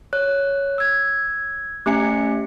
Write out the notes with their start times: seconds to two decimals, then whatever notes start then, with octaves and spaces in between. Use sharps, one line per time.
0.13 C#5 F#6
0.78 E6 G#6
1.86 A3 C#4 G4 E5 G#5 C#7